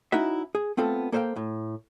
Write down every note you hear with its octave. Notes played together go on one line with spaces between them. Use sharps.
C#4 D#4 E4 F#4 E5
G#4
A3 B3 C4 F4 A4
A#3 A4 C5 D5 F5 G5
A2